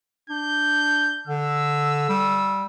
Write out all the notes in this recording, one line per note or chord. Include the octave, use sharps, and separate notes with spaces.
D4 G6
D3 E6
G3